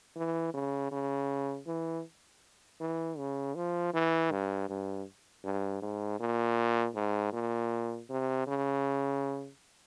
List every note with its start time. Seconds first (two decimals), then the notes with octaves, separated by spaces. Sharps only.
0.16 E3
0.54 C#3
0.91 C#3
1.67 E3
2.80 E3
3.18 C#3
3.55 F3
3.94 E3
4.31 G2
4.69 G2
5.44 G2
5.82 G#2
6.20 A#2
6.95 G#2
7.33 A#2
8.09 C3
8.47 C#3